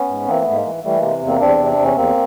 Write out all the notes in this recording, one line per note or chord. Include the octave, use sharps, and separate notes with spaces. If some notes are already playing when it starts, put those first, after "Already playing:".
Already playing: B3 C#4
G#2
E3 A#3 C4
A3 B3
G#2
G#3 A#3
E3
E3 G3 A3
C3 G#3 A#3
E2
A#3 C4
E2 C4 D4
C3
D4
E2
C#4
E2 A#3 C4